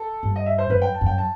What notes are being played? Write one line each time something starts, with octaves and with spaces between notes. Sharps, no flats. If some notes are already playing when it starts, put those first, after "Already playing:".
Already playing: A4
G2
D#5
E5
C5
F#2 B4
G5
A5
F#2
G5
A5